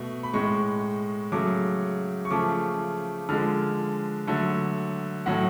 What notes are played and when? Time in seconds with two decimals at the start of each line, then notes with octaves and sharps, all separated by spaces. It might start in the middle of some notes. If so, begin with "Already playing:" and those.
Already playing: B2 A3
0.23 B5
0.33 A2 G#3 C#6
1.32 C#3 F#3 A3 D6
2.25 C#6
2.31 C#3 F3 A3 D6
3.29 D3 F3 G#3 F6
4.27 D3 F#3 A3
5.26 A2 F#3 A3 F#5